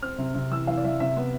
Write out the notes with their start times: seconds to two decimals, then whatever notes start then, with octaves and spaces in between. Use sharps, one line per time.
0.02 C4 F6
0.18 C3
0.35 C3
0.51 E3 E6
0.67 E3 F5
0.77 D5
0.84 E3 E5
1.00 C3 E5
1.17 B3